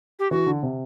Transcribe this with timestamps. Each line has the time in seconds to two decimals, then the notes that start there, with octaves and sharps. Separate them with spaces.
0.19 G4
0.31 E3 F#4
0.46 D3
0.63 C3